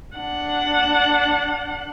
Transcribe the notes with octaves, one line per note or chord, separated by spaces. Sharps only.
D4 F#5